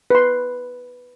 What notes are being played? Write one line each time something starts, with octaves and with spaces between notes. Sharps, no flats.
B4 C6